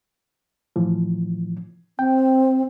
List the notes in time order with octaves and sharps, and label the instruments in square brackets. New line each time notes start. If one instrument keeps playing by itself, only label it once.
[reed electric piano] A2 E3 F3
[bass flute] C4 [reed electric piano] G5